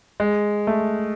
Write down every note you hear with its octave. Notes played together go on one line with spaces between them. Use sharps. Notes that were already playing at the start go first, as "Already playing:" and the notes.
G#3
A3